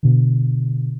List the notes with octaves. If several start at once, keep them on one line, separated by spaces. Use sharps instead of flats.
B2 D3